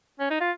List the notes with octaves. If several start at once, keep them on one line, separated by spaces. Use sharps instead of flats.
C#4
D#4
F4